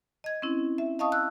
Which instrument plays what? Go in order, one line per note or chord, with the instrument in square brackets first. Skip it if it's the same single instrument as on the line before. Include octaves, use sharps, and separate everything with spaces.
[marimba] D#5 G#6
C4 C#4 E4
E5
D#5 F5 A5 C#6 D#6
E6 F#6